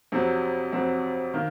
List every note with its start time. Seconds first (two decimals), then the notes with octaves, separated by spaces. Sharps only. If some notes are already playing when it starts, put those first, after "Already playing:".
0.12 F2 C3 F#3 C4
0.72 F2 C3 F#3 C4
1.34 D#3 A#3